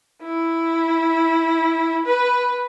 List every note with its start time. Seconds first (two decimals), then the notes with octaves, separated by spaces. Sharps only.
0.23 E4
2.05 B4